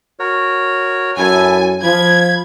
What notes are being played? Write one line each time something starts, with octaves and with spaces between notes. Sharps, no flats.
F#4 A#4 C#5
F#2 E4 A4 G#5
F3 B5 G#6